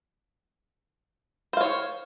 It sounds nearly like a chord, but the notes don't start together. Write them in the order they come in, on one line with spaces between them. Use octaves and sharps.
C5 F5 C#5